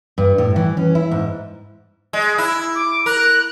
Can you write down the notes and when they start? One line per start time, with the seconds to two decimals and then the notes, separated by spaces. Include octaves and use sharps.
0.18 G2
0.38 A2
0.56 E3
0.77 C#4
0.95 E4
1.11 G#2
2.13 G#3
2.38 E4
2.75 D6
3.06 A#4 F#6